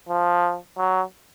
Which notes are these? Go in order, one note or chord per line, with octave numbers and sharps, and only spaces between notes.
F3
F#3